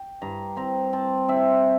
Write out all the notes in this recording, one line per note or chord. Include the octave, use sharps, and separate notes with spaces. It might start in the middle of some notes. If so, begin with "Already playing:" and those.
Already playing: G5
G2 A#5
C4 A#5
C4 A5
C4 E5